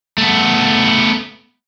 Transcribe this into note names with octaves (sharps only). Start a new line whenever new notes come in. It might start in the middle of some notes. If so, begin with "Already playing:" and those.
A3 B3